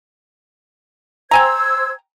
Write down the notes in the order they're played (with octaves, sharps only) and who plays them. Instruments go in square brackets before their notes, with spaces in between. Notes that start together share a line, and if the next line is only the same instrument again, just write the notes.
[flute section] C5 E6 G#6 [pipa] G5 G#5 A#5